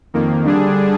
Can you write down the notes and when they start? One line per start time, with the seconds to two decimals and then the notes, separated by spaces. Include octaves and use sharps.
0.14 F2 D#3 A#3
0.44 D3 G3 D4 G#4